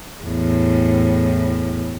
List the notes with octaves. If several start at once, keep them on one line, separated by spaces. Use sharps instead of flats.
E2 A2